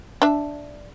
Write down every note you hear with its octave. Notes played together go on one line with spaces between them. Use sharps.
D4 E5